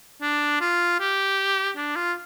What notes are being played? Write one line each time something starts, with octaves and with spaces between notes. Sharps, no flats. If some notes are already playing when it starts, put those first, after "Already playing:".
D4
F4
G4
D4
F4